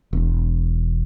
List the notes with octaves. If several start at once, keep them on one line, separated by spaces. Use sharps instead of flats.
E1